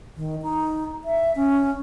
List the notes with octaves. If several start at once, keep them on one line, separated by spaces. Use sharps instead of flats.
D#3
D#4
E5
C#4